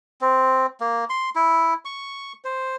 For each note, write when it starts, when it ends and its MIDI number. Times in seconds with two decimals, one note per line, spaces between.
0.21 0.66 60
0.80 1.05 58
1.10 1.30 84
1.36 1.74 64
1.85 2.33 85
2.45 2.76 72